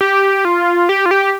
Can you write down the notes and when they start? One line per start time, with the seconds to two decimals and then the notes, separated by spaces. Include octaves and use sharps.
0.01 G4
0.45 F4
0.89 G4
1.06 F4
1.11 G4